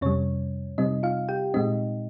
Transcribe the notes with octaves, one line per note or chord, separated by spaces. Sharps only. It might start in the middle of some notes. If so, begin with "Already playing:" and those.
F2 C3 G3 C#4 C#5
C3 G3 C4 D#4 D#5
F4 F5
G4 G5
A#2 G#3 C4 D#4 D#5